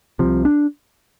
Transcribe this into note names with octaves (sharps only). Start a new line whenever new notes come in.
C2 C3 F3
D4